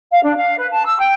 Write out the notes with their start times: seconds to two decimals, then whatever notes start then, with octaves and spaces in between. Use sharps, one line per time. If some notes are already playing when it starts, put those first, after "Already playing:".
0.11 F5
0.23 D4
0.37 F5
0.58 B4
0.71 A5
0.85 E6
0.99 G5